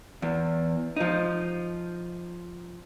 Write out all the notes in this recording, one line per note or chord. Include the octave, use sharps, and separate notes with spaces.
E2
F3 D#4